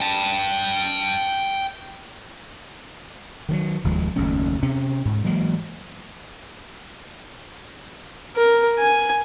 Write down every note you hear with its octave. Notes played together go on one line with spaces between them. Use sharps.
G5 A5
D#3 F3 F#3
F1 D#2 F3 G#3
F#1 D#2 A3 C#4
C3 C4 C#4
D2 G#2
E3 F#3 G#3 A#3
A#4
G#5